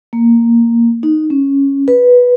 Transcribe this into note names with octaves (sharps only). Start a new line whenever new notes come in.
A#3
D#4
C#4
B4